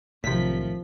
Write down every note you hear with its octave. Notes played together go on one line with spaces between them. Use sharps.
B1 A2 C3 D#3 F3 B6